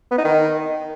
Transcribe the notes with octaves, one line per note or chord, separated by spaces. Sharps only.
B3
D#4
D#3